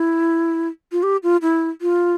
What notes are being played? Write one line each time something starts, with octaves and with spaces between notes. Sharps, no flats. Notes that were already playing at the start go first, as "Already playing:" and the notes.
Already playing: E4
F4
G4
F4
E4
F4